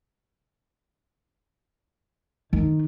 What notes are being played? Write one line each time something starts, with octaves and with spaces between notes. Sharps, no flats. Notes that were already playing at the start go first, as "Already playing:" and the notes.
D#3